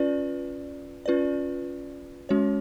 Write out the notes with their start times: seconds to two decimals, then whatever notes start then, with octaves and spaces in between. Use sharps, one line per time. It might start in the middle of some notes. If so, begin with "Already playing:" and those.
Already playing: C#4 F4 B4 D5
1.06 C#4 F4 B4 D5
2.29 G#3 C#4 F#4 C#5